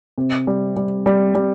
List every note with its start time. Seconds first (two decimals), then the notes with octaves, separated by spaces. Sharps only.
0.18 C3
0.47 G3
0.76 G3
1.06 G3
1.35 G3